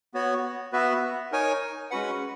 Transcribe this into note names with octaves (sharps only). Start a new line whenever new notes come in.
B3 F#4 C#5
B3 F#4 B4 E5
D#4 A#4 C#5 G#5
G#3 C#4 F#4 B4 F#5